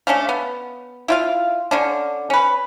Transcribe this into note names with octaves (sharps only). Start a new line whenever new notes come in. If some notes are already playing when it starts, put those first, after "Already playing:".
A3 C#4 D4 F5
B3
E4 F4 F5
D3 C#4 D4
C#4 B4